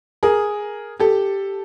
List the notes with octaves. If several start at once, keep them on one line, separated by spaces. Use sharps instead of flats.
G#4 A#4
G4 A4